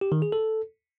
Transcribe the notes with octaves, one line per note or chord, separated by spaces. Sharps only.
G4
D#3
G#4
A4